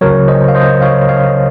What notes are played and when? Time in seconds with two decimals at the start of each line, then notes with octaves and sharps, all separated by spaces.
0.01 C#2 C#3 F#3 A#4 C#5
0.28 C5 D#5
0.48 F5
0.55 C5 D#5
0.82 C#5 F5
1.09 C#5 F5